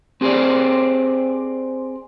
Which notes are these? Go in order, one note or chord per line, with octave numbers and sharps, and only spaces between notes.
C4 G4 G#4 C5 D5